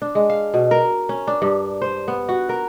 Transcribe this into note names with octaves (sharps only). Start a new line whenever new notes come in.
D4
G#3
F5
B2
A#4
C#4
D4
G2
C5
B3
F#4
A#4